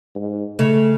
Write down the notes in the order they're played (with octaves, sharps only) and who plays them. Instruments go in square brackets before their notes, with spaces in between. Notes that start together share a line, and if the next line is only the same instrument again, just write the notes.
[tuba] G#2
[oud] C#3 [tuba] A3